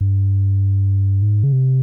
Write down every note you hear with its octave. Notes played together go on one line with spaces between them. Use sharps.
G2
G#2
C#3
C3